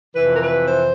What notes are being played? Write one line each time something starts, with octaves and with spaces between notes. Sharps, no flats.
F2 C3 E3 B4
A#4
B4
C5